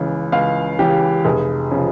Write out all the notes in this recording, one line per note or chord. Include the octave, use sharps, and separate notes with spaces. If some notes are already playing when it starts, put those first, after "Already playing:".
Already playing: C#2 C#3 E3
C#2 F5
C#3 E3 G4
F1 G#4
C#3 F3